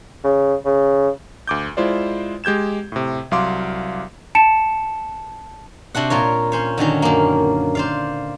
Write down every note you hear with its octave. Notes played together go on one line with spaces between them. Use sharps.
C#3
C#3
D2 D6 G6
G#3 E4 F4 C5 D5
G#3 G4 G6 G#6 E7
A2 C3
C2 F#3 F5 C6 D6
A5 C#7 D7 E7
C3 D4 F#4 F#5
A#2 F4 A#4 C#5
C#4 C5 C#5
D3 D#3 F#3 C#4
F#2 A#3
C5 D5 F5